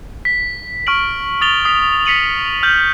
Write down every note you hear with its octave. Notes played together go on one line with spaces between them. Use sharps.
B6
C#6 F6 B6 D7 F#7
D#6 A6 F7 G7
D#6 B6
B6 C#7 D#7 F#7
F6 G6 F#7